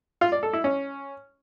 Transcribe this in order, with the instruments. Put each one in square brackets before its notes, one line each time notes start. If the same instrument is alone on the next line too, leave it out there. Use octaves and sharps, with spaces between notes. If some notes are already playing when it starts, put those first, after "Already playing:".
[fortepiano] F4
D5
A4
E4
C#4